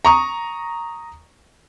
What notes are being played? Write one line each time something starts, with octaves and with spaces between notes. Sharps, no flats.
A#5 C#6 D#6